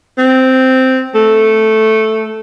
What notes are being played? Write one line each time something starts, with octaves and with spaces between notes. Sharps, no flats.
C4
A3